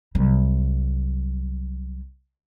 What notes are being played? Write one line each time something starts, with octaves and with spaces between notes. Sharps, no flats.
C2 F#3